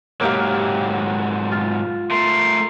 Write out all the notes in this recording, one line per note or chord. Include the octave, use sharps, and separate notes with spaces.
G#2 F#3 A#3 G4 F5
F4
A3 A#4 C6